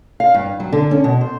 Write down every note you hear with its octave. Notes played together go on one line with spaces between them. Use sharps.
F5
G2
F#3
D3
C#4
B2
C5